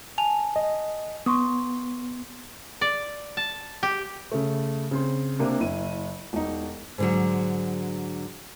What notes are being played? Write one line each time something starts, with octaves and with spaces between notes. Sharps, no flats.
G#5 A5 F7
D#5
B3 C6 C#6 D#6
D5
A5
G4
C#3 A3
C#3 C4 C6
C3 A#3 D4
F#1 E4 D#7
E1 D#4
G#2 D3 F#3